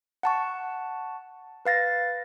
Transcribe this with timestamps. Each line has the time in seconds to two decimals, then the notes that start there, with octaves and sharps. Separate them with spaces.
0.23 F#5 A5 C#6
1.65 B4 F5 A6 A#6